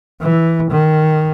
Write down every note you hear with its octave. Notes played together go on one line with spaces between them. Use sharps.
E3
D#3